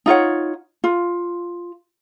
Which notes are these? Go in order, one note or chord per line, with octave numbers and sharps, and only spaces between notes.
D#4 F4 C#5 F#5
F4